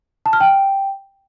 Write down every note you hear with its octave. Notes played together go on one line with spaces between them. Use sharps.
A5
F6
G5